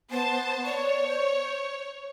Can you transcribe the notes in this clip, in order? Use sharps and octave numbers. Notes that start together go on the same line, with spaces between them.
B3 C5 A5
C#5 D5
C5